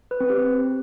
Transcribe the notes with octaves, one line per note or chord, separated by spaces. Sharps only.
B4
C4
G4